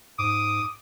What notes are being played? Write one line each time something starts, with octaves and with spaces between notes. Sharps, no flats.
G#2 D6 D#6